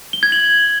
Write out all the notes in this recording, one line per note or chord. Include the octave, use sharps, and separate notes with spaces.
G7
G#6
F#7